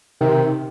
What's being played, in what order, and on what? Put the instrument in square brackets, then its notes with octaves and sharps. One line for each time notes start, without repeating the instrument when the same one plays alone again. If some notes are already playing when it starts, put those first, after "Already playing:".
[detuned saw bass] C3 [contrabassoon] D#3